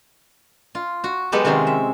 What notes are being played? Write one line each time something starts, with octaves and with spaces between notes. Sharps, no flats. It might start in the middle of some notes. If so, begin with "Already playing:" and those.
F4
F#4
F#3 G#3 B3 G4 A4
C3 D#3 C#4 F4 G#4
E5